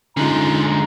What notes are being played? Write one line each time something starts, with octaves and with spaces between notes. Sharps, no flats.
D3 G#3 C#4 D#4 F4 A#5